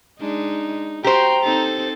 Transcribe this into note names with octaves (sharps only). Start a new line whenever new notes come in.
G#3 D4 D#4
F#4 G4 C5 G5 A#5 C7
C4 D#4 A4 A6